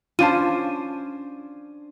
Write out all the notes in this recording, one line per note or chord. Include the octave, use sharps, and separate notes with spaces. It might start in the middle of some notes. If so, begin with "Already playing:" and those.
C#4 D4 F4 C5 A5 D#7